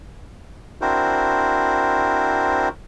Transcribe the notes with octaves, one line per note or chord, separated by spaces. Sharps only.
C4 D4 E4 F#4 A#4 C5